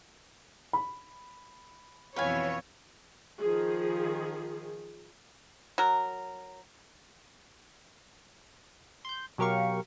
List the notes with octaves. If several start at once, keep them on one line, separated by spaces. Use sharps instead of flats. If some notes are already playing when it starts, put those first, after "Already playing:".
B5
F2 B2 E3 B4 C#5 F5 G#5
D#3 F3 G#4
F#3 A#4
C6 G6
B2 F#3 G4 A#4 F5 C#6